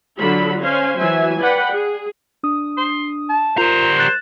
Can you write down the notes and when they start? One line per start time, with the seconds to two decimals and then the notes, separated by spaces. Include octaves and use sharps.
0.18 D3 F#3 F4 A4 B5
0.61 C#4 C5 F5 G#5
1.00 E3 F#3 E5 G#5
1.40 B4 D5 F#5 G5 B5
1.72 G#4
2.43 D4 D#6
2.78 C6
3.29 A5
3.58 G3 F4 A#4 C5 A#5
3.99 F#6 A6 E7